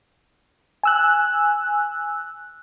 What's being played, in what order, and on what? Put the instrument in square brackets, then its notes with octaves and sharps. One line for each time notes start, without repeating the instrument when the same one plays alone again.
[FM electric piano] G#5 E6 F#6